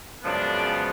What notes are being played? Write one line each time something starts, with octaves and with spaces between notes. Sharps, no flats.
F#2 C#3 F3 G#3 B3 D4